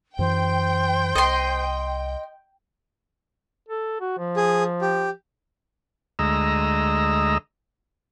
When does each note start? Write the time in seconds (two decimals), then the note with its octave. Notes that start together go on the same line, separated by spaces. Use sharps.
0.19 F#2 E3 C5 G5
1.15 C2 D#5 C6
3.69 A4
4.01 F#4
4.19 F3
4.37 G#4
4.82 G4
6.19 D2 G#3 D#5 A#5 E6